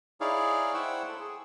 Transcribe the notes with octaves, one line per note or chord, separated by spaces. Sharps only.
D#4 E4 G#4 C#5 D5 F5
E4 C5 F#5 G5 C#6 E6
A4
G#4